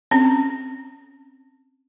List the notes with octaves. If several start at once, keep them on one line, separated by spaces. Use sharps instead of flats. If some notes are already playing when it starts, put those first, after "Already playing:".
C4 C#4